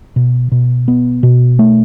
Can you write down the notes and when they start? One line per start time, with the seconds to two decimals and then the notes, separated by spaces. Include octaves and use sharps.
0.16 B2
0.52 B2
0.88 B3
1.23 B2
1.59 A3